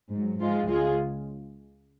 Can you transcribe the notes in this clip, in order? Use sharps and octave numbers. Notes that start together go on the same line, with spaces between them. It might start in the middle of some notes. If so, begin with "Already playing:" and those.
G#2 F#3
G#2 F3 G#3 F4
C#2 C#3 G#3 F4 G#4